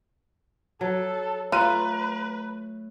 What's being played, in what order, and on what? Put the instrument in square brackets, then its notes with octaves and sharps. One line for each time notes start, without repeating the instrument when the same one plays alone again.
[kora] F#3 [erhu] A4
[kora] A3 [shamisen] F4 [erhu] B4 [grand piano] A#5 F#6 D#7